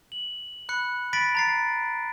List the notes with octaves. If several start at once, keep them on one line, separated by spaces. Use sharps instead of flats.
F#7
B5 F#6 C#7
B5 A6 B6 D7
A#5 A6 C7